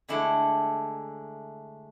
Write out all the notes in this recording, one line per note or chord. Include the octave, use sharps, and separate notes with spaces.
D3 G#3 A3 D4 E4